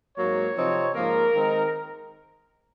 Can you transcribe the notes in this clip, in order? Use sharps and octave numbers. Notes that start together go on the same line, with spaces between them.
G#2 F#3 A#3 C#5
C3 F3 C4 D#4
G#2 F3 A#3 A#4
D#3 G#3 C4 D#4